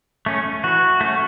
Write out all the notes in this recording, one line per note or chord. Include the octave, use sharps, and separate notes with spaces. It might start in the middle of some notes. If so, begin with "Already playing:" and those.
A3 C#4
E3 F#4
A3 C#4